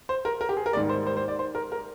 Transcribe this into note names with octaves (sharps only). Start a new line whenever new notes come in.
C5
A#4
A#4
G4
G#4
A#4
G#2 D#3 G3 A#3 D5
C5
C5
C5
D5
C5
A#4
A#4